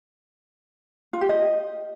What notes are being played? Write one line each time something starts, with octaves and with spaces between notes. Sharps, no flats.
F4
G4
D#5